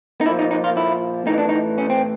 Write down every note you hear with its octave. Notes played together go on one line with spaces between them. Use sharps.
D#4
A#2 F3 E4
D#4
D#4
F4
E4
A2 E3 D#4
D4
D#4
C#4
C4